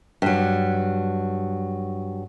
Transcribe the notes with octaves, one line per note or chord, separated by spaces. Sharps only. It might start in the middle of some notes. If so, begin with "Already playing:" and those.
G2 F#3